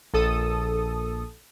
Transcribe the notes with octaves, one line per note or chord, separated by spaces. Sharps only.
A#1 A4 D#6